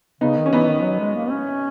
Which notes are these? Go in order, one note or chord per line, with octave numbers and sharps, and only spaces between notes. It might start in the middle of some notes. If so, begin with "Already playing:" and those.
C#3 B3 D#4
D#3
C#4
E3 B3 D#4
D#3
F#3
G#3
A#3
C#4